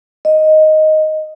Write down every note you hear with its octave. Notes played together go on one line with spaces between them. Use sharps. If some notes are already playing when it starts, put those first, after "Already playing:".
D#5